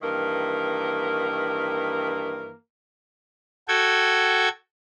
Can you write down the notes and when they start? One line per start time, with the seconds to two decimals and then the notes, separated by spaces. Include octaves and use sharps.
0.02 G2 D#3 E3 A#3 A#4
3.68 F#4 A4 G5 G#6